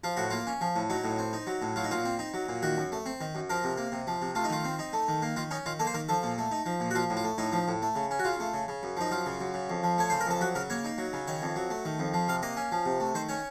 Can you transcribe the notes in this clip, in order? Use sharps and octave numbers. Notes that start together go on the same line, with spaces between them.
F3 F4
A2 F#4
A#3 F4
C#4
F3
A2
F#3 D#4
A2
C4
D#4
F#3
A2
F#3 F4
D#4
A#2 F4
C4
D#4
F#3
A#2
D#3 F#4
F#2
A3
C4
D#3
F#2
F3 A#4
C3
A#3
C3
F3
C3
A3 F4
D#4
D#3 F4
C4
D#4
A3
D#3
A#3
D#3 F4
C#4 D#4
D#3 F4
A#3 A4
C5
D#3 A#4
F3 A4
A#2
A3
D#4
F3
A#2
F#4
F3 F4
A2
F4
A3
A2 D#4
F3
A2
A3
C#3
C#4
F#4
C#3 F4
A3
C#3
C#3
F#2
F3 D#4
F#2 F4
C#3
F#2
C#3
F2
F3
A3 C#5
C#3 C5
A#4
F2 A4
F#3 F#4
C#3 A#4
A#3 C#5
D#4
F#3
C#3
D#3 C#5
F2
F#3
A3
D#3
F2
F3
C3 F5
A#3 D#5
C#4
F3
C3
A3
D#3 C5
C#4 C#5